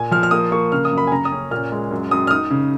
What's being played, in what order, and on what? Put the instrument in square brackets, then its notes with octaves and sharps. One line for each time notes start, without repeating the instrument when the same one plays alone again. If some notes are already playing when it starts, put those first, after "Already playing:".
Already playing: [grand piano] A#2 G#5
F3 F6
F6
A#3 D#6
A#3 C#6
C#3 F6
D#6
F#2
B5
G#5
C#3 A#5
D#6
C#4
A#2 F6
G#3
F#2
F#2 D#6
F6
D#4 D#6
C#3